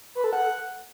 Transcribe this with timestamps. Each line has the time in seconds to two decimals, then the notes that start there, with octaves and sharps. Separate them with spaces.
0.15 B4
0.24 A4
0.33 F#5